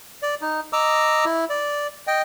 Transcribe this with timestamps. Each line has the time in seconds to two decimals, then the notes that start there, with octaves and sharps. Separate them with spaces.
0.23 D5
0.42 D#4
0.73 D#5 A#5 D6 E6
1.25 E4
1.50 D5
2.07 D#5 G5